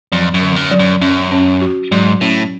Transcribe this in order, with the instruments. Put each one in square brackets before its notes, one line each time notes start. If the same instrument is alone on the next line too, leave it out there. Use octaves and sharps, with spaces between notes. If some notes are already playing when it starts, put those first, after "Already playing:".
[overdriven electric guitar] F2 [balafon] F#3
[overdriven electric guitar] F#2
[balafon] D3
[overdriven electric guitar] F2
F#2
[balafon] F#3
[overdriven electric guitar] F#2
[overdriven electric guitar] F#2 [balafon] C#4
[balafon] C#4
F#4
[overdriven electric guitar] G#2 [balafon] F#3
[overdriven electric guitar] A2 [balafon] C#4